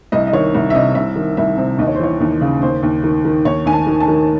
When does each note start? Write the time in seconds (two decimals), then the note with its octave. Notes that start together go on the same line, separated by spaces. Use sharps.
0.12 C2 D#5
0.27 D#5
0.33 D#3 C#5
0.54 C2
0.70 E5
0.74 C3 D#5
0.95 C2 E5
1.16 D#3
1.37 C2 E5
1.58 C3
1.78 D#2 D#5
1.87 C#5
1.95 C5
1.99 E3 C#5
2.21 D#2
2.41 C#3
2.62 D#2 C5
2.83 D#2
3.04 D#3
3.25 D#3
3.45 D#2 C#5
3.65 D#2 G#5
3.73 A5
3.87 D#3
4.00 A5
4.08 D#3